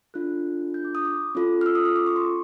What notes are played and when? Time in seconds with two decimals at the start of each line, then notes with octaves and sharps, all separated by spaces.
0.14 D4 F4 A4 F#6
0.74 G6
0.85 D6
0.95 D#6
1.05 D6
1.35 C#4 F4 A4
1.61 F6
1.66 E6
1.75 D#6
1.85 D#6
1.96 D6
2.06 C#6
2.16 C6